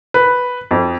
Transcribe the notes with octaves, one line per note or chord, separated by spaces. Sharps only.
B4
F2